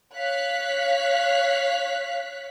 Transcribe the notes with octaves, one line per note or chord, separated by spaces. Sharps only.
C#5 F5 F#6 B6